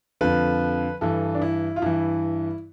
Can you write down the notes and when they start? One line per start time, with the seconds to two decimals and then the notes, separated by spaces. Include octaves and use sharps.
0.21 F2 D3 F3 B4
1.01 G2 E3 A4
1.35 D4
1.42 E4
1.76 F4
1.82 G2 E3 E4